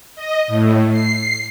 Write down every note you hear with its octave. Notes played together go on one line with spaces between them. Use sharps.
D#5
A2
C7